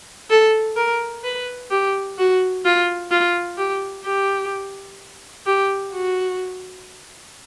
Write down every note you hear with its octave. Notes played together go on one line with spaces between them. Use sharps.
A4
A#4
B4
G4
F#4
F4
F4
G4
G4
G4
F#4